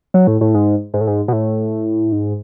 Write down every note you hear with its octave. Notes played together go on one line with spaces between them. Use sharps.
F#3
A2
A2
G#2
G#2
A2
G#2
B2
A2
G#2